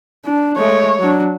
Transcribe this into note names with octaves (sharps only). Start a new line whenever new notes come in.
D4
G#3 A3 C#5
F#3 D4